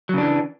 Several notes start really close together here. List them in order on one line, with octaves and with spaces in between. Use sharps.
F#3 C#3 D4 E3